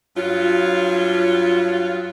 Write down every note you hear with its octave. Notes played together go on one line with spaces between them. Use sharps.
G2 F#3 F4